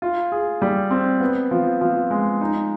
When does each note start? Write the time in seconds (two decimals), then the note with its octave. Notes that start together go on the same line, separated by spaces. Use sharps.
0.02 F4
0.32 G#4
0.62 G3
0.91 C4
1.20 B3
1.51 F3
1.81 F3
2.11 G#3
2.41 D#4